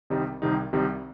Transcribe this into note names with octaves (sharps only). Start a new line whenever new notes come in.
C2 C3 D#3 G3 D#4
C2 C3 D#3 G3 D#4
C2 C3 D#3 G3 D#4